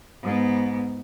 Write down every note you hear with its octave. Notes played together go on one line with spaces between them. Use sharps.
G#2 B3